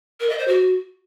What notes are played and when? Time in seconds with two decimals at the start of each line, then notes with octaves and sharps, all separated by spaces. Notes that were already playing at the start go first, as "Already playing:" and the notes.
0.20 A#4
0.29 D#5
0.38 C5
0.47 F#4